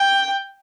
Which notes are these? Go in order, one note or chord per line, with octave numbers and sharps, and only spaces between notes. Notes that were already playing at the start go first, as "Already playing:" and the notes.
Already playing: G5